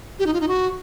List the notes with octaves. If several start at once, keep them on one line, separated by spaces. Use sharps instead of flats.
G4
D#4
F4
D#4
F#4